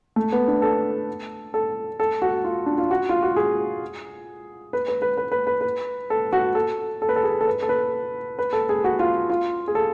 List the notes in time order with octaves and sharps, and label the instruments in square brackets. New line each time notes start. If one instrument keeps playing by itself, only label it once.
[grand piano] A3
B3
D4
A4
A4
A4
F#4
F4
D4
F4
F#4
F4
F#4
G#4
B4
B4
B4
B4
B4
B4
B4
A4
F#4
A4
A4
B4
A4
G#4
A4
B4
A4
B4
B4
A4
G#4
F#4
F4
F4
G#4
A4